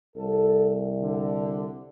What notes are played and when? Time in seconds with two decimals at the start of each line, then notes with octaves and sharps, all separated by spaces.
0.16 C2 A4
1.01 D3